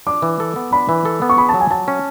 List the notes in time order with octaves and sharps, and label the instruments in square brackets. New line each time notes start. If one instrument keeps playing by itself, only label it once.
[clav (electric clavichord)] D4 [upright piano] D6
[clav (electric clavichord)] E3
A4
B3
[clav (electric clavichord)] D4 [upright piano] B5
[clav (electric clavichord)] E3
A4
B3
[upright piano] C#6
[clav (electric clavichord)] G#4 [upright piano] B5
[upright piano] A5
[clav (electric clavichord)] F#3
[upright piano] G#5
[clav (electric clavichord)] F#3 [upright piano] A5
[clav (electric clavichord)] C#4